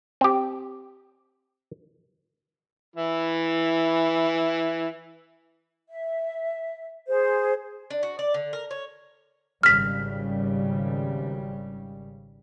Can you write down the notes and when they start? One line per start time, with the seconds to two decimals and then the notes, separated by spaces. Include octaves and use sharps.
0.21 C4 G4
2.96 E3 E4
5.88 E5
7.08 G#4 C5
7.90 D4
8.03 F#4
8.19 D5
8.34 D3
8.53 A#4
8.71 C#5
9.63 G#1 C#3 G3 F6 B6